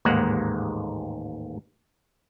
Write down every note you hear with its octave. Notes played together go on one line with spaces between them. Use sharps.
A1 D#2 G#2 G#3 A#3 F#5